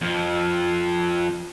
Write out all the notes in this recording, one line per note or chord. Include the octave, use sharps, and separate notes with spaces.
F2 F3